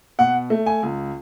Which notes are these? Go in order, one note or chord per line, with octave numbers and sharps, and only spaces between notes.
B2 F#5
A3
G#5
C#2